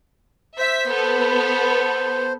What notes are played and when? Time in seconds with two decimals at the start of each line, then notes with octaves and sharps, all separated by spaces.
0.58 C5 E5 B6
0.89 B3 A4